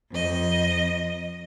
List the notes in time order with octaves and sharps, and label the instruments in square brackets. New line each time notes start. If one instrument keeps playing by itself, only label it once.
[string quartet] F2 D#5